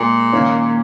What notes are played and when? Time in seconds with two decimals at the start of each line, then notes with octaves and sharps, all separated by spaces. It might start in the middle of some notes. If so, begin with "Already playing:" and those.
Already playing: A#2 G#3
0.33 D#3 A#3 C#4